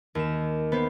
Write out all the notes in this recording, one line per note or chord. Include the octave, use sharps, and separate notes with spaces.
D#2 E7
B3 C5